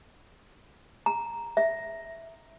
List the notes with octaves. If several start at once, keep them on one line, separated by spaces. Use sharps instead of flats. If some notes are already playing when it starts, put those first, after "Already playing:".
A#5
E5